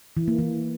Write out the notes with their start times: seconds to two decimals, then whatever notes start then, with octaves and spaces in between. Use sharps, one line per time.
0.17 E3
0.28 A#3
0.39 E3